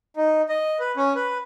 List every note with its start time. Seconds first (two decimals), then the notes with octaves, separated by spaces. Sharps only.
0.17 D#4
0.49 D#5
0.80 B4
0.97 C#4
1.16 B4